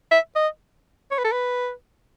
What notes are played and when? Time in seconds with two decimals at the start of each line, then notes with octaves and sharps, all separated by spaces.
0.11 E5
0.36 D#5
1.11 C#5
1.18 B4
1.24 A4
1.32 B4